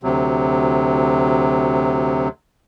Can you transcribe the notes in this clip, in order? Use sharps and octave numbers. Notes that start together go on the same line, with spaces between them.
D2 C3 F#3